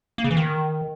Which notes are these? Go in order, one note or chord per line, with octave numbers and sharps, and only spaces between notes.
A#3
C#3
E3
D#3